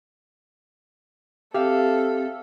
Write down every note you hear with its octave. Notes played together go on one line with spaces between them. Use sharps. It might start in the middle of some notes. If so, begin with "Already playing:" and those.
C4 G4 A4 E5 F5